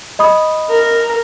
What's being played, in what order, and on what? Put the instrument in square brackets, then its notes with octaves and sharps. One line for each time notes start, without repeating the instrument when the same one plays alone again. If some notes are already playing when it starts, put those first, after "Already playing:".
[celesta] D#5 B5 D#6
[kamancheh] A#4